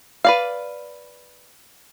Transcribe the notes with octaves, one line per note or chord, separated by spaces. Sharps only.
B4 D5 F5